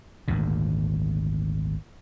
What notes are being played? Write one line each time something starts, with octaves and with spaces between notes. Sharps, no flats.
G#1 D2 A#2